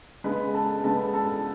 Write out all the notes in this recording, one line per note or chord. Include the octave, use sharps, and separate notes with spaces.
C#3 G#3 B3 B4 B5
A4 A5
C#3 G#3 B3 A4 A5
A4 A5